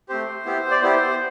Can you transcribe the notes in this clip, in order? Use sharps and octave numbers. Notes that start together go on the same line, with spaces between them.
A3 C4 G4 C5
B3 E4 G4
D5
B3 E4 G4 C5